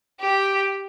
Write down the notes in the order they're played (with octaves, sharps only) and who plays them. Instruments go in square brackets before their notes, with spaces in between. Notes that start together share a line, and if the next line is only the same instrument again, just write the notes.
[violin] G4